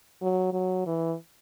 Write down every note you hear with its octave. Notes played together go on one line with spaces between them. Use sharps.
F#3
F#3
E3